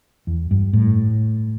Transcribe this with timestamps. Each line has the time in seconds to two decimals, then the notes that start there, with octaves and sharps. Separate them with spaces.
0.27 E2
0.51 G2
0.73 A2